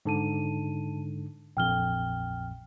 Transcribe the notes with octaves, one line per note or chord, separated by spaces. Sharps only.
G#2 D3 D#4 A5 D#7
A#1 F2 G5 F6 G7